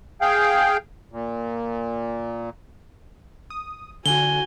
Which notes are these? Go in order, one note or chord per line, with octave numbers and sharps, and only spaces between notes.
G#4 F5 G5
A#2
D#6
D3 F#4 G#5 G7